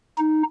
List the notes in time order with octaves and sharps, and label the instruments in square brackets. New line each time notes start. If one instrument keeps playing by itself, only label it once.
[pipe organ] D#4